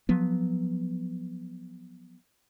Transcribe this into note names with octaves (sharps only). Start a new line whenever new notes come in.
F3 F#3 B3